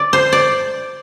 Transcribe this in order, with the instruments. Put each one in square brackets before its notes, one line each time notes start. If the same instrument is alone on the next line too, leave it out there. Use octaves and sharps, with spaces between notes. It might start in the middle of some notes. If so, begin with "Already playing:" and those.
Already playing: [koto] D5
C5
D5